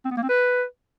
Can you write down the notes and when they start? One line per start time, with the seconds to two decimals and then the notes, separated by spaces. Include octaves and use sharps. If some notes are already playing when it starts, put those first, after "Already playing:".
0.05 C4
0.11 B3
0.17 A#3
0.23 C4
0.29 B4